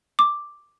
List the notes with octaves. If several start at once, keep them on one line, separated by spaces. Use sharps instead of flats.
D6